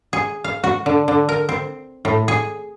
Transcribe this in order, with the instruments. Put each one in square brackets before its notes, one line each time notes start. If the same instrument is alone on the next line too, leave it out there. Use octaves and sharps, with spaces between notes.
[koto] G#4
F5
F#4
D3
D3
A#4
C4
A2
G#4